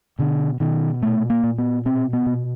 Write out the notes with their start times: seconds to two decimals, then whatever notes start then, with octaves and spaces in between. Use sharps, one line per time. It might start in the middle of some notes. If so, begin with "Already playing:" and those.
0.19 B2 D3
0.60 B2 D#3
1.02 A#2 A3
1.30 A#3
1.43 A#2
1.58 B3
1.85 B2 C4
2.13 B3
2.26 B2